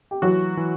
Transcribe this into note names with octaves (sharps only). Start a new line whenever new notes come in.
G4
E3 F#3 F#4
E3